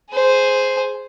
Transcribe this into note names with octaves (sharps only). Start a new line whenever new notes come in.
G#4 C5